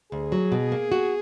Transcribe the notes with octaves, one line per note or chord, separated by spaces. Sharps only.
D2 G#4
F#3
B2
A#3
F#4